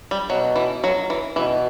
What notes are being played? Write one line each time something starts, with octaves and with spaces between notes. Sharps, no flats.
G3
B2 F#3
E3
F#3
E3
B2 E3